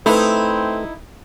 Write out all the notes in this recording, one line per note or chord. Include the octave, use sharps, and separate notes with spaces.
A3 C4 D#4 E4 B4